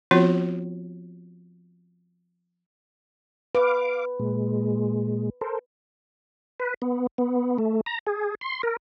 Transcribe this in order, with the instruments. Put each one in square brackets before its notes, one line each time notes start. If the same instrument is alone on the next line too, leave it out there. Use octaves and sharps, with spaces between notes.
[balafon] F3 B3 C4 F4 F#4 C#5
[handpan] B4 [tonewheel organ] F5 D6
[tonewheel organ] A#2 G#3
A4 A#4 C5
B4
B3
B3
A3
A#5
G#4
C6
A#4